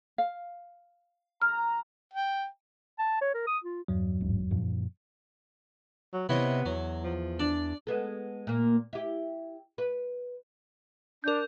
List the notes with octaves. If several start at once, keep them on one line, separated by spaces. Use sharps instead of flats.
F5
A#5 F6
G5
A5
C#5
A#4
D#6
F4
E2 G2 F#3
D#1 A1 G#2
F#2 A#2 F3
F#3
C3 B3 E4 C#5 D#5
E2 F#3
F3
D4 D5
G#3 B3 A4
A#2 A#3
E4 G4
B4
D4 A#4 G6